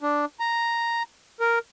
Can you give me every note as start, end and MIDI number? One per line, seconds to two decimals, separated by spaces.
0.01 0.25 62
0.40 1.03 82
1.40 1.59 70